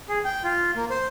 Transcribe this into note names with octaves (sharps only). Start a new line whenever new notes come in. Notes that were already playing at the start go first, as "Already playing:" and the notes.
G#4
G5
F4
A#3
C5